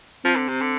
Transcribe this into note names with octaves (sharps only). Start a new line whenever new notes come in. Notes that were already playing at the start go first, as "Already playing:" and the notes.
F3 C4
D3
C3
D3